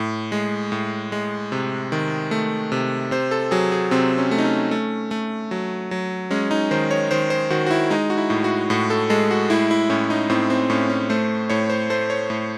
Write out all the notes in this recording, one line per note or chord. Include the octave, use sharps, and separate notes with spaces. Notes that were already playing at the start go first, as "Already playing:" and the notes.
Already playing: A2
G#3
A2
G#3
C3
D#3
A3
C3
C3 C5
A4
F#3 G#4
G#4
C3 C4
C#4
A3
D#4
C#4
A3
A3
F#3
F#3
G#3 C#4
D#4
D#3 C5
C#5
D#3 C5
C5
D#3 F#4
F#4
E4
G#3 D#4
F#4
E4
A2
F#4
A2 F#4
A4
G#3 A4
F#4
A2 E4
E4
A2 C#4
D#4
A2 C4
C4
A2 C#4
C#4
A3 C5
A2 C#5
C5
A3 C5
C#5
A2